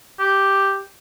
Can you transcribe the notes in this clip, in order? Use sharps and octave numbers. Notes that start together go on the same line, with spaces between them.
G4